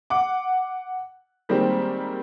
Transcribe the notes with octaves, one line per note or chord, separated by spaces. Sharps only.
F#5 D6
D#3 G3 G#3 A#3 C4